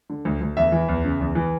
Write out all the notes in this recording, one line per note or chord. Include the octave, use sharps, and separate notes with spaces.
D3
D2
D2
E2 E5
E3
E2
C#3
E2
E3